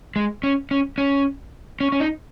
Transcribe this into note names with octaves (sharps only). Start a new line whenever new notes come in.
G#3
C#4
C#4
C#4
C#4
C#4
D#4